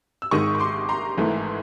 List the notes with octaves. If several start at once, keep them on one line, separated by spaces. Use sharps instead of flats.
E6
G#1 G#2 D#3 G#3 C#6 D#6
C#6
C6 D6
A#5 C6
G#1 G#2 E3 A3